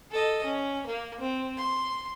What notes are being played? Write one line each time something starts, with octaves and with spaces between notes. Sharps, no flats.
A4 D#5
C#4
A#3
C4
C6